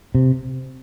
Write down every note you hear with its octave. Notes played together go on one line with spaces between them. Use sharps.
C3